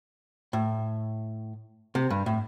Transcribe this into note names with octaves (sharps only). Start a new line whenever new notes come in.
A2
C3
G2
A2